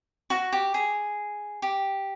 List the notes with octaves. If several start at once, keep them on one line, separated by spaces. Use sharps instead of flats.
F#4
G4
G#4
G4